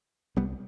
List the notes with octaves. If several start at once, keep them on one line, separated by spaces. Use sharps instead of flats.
C2 G3 B3